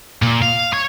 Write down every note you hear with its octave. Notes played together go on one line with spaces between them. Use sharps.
A#2
F5
C#5